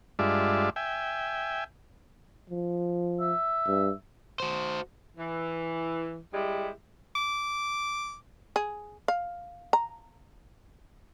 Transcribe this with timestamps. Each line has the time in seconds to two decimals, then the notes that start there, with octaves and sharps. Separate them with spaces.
0.19 G2 G#3 D4 F4 D5 E5
0.76 E5 G5 G#5
2.50 F3
3.20 E5
3.67 G2
4.40 F#4 C5
5.18 E3
6.34 G3 G#3 E4 G4
7.16 D6
8.56 G#4
9.08 F5
9.73 A#5